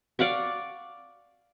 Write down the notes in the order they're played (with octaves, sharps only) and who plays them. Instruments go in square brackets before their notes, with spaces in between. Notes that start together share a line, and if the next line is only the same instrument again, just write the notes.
[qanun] D5 F5 F#5 C#6